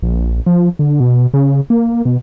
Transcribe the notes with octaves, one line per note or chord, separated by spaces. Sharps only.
A#1
F3
D3
B2
C#3
A#3
B2